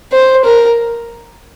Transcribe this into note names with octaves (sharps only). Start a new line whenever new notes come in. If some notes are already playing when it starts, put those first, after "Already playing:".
C5
A#4